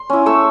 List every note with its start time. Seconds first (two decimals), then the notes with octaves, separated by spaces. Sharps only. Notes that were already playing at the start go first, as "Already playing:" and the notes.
Already playing: C6
0.10 C#4 E4
0.26 A3 C#6 E6